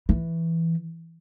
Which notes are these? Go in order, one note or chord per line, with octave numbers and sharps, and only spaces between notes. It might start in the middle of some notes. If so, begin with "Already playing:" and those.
E3